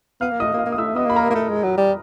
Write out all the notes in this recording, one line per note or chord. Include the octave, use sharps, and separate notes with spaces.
B3 F5 F6
A#3
A3 D#5 D#6
A#3
F5 F6
A#3
D#6
A3 E5 E6
B3 D#5 D#6
A#3 B5
A#4 A#5
A#3
A3
G#3
F#3
G3